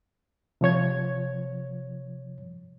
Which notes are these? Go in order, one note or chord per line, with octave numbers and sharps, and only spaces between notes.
C3 F3 C#5 G#6